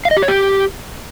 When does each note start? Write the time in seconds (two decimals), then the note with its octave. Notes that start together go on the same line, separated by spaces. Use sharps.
0.05 F5
0.11 D#5
0.17 G4
0.22 C#5
0.28 G4